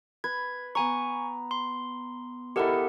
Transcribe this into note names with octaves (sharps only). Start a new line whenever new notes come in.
B4 G#6
B3 G#5 A#5 C#6
C6
E4 G4 A4 A#4 D#5 F#5